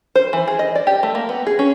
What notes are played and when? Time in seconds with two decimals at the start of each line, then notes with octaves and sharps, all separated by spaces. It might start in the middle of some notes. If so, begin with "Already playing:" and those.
0.15 C5
0.33 E3
0.48 G#4
0.59 D#5
0.75 D5
0.87 G4
1.03 A3
1.15 A#3
1.29 B3
1.47 G#4
1.59 C#4